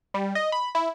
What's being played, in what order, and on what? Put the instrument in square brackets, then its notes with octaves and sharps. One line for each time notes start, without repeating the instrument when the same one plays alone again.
[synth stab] G3
D#5
B5
E4